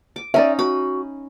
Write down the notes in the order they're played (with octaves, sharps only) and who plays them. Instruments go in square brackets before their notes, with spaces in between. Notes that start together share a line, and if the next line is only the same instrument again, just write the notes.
[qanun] D6
[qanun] C#4 D#4 [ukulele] D5 E5
[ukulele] F#4 [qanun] B5